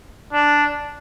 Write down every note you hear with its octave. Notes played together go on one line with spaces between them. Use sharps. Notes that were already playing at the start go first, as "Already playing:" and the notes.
D4